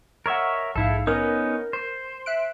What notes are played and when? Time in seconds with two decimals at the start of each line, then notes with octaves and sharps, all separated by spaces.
0.26 A#4 C#5 D#5 E5 F#5
0.76 A#1 G#2 E4 A4 F5
1.07 B3 C#4 D#4 A#4
1.73 C5
2.26 E5 F#6 D7